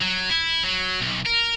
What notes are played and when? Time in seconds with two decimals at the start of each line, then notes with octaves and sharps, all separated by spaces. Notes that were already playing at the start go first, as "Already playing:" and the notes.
0.01 F#3
0.29 E4
0.63 F#3
1.02 B1
1.26 A#4